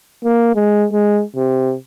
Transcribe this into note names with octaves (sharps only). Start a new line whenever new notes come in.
A#3
G#3
G#3
C3